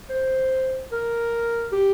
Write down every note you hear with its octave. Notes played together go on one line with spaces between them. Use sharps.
C5
A#4
G4